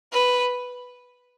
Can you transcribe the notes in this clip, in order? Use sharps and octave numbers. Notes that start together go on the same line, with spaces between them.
B4